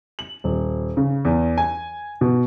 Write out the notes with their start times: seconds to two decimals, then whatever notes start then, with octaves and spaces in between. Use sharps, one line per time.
0.19 F#7
0.44 D#1
0.97 C#3
1.25 E2
1.58 G#5
2.21 B2